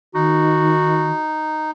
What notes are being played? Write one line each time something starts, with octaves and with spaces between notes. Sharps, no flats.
D#3 D#4 F#4